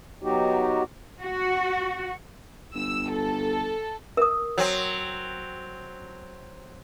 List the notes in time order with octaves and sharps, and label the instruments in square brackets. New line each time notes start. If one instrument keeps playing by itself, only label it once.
[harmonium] F#3 B3 D#4 F#4 G4
[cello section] F#4
[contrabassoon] G1 [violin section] E6
[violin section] A4
[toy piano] A#4 D#6
[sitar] F#3 C4